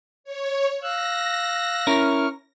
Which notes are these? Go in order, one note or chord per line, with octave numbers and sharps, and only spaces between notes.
C#5
F5 E6 F#6 A#6
C#4 E4 A#4 C#6 F6